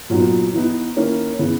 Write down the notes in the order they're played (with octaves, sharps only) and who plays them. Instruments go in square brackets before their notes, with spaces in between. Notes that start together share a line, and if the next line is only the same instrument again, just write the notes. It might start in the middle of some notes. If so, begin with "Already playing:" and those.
[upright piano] A#2 F#3 B3 D#4
E3 B3 D#4
D#3 A#3 C#4 E4
C#3 E3 B3